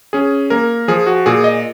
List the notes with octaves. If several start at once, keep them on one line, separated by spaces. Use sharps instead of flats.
C#4 G#4
A#3 A#4
F3 G#4
F#4
A#2 G#4
D#5